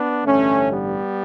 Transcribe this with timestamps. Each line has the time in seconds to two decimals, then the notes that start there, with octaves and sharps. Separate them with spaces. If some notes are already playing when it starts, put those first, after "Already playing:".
Already playing: B3 D4
0.24 A1 G2 D3 A3 C#4
0.70 G3 B3